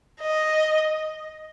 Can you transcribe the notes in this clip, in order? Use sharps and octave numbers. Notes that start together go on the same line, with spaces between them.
D#5